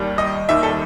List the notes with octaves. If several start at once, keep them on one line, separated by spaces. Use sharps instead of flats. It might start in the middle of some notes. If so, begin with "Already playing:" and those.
Already playing: D#2 D#3 G3
D#5
D#2 D#3 G3 E5
A4